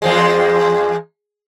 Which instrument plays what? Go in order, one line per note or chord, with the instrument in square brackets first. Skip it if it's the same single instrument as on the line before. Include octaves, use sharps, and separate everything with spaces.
[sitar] E2 F3 G#3